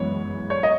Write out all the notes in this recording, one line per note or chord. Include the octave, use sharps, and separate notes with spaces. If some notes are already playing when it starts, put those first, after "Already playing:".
Already playing: F#2 E3 G#3 B3 C#5
C#5
D#5